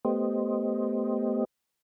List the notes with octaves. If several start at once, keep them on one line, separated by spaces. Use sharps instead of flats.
A3 B3 G4 C5 D#5